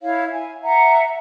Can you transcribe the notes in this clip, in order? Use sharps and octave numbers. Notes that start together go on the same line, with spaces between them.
E4 C#5 F5
G#5
E5 F#5 A#5